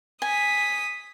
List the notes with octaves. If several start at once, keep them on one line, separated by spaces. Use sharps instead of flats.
G#5 D#6 B6